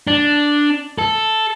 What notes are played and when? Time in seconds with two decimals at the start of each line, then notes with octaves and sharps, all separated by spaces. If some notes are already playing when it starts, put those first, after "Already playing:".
0.07 D4
0.98 A4